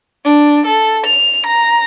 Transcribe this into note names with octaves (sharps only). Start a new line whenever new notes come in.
D4
A4
F7
A#5